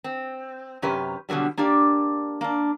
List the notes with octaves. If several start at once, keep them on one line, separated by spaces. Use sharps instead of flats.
C4
F#2 C3 C#4 G4 B4
B2 D3 E3 F#3 G3
A#3 D4 G4 D5
A#3 D4